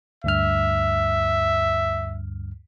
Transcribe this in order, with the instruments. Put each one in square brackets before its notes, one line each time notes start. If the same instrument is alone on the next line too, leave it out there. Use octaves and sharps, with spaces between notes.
[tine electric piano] D2 G2 F6 [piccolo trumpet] E5